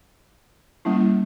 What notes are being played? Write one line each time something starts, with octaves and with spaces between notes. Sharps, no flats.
G3 A#3 C#4 E4